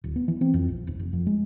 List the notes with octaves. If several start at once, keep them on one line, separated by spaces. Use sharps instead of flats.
D1
B3
E3
C4
F2
A#1
E1
F1
F2
G#3